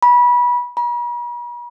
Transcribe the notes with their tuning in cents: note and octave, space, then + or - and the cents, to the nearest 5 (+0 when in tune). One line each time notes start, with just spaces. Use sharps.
B5 -25
B5 -45